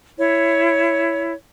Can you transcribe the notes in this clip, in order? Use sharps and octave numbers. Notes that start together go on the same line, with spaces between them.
E4 C#5